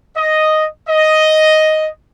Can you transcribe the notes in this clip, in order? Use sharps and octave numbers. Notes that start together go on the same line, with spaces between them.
D#5
D#5